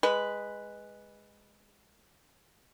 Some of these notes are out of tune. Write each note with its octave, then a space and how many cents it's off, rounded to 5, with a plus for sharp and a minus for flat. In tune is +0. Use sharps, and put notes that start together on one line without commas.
G#3 -10 B4 +0